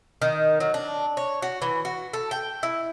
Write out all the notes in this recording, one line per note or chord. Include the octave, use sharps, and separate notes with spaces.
D#3
F#3
D4
C#5
F#4
E3
F#4
A4
G5
E4